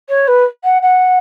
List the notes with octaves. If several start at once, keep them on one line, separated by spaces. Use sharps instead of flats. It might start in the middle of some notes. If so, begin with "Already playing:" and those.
C#5
B4
F#5
F#5